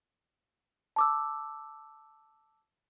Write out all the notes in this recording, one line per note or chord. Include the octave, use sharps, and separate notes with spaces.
A5 D6 E6